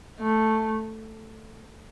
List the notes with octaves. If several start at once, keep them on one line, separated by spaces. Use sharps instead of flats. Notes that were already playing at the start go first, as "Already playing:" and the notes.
A3